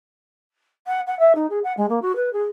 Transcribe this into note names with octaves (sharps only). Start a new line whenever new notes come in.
F#5
F#5
E5
D#4
G#4
F#5
G#3
A#3
F#4
B4
G#4